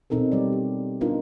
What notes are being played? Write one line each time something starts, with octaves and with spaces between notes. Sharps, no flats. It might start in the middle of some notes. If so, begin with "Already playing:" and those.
B2 C4 D#4 A4 A#4
G3 C#5 D5
G4
B3 D4 D#4 F4 A#4